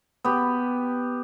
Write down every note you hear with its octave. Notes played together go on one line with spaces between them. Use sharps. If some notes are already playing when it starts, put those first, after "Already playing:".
B3 G4